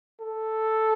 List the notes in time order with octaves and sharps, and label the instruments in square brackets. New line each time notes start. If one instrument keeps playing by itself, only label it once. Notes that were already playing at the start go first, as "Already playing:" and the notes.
[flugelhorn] A4